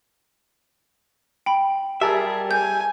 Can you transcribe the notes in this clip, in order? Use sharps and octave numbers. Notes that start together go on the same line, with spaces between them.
G5 B5
G3 G4 G#4 A#4 E5 A5
G#5 G6